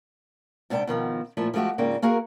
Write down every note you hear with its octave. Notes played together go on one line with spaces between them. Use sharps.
G#2 C3 D4 A#4 G5
B2 D#3 F3 C4
A#2 F3 A3 E4
F3 G#3 A3 F#4 G4
G#2 C#3 A#3 C4 D4 F4
A#3 F#4 G#4 A#4